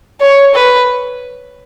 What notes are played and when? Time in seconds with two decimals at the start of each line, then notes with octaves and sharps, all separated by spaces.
0.20 C#5
0.54 B4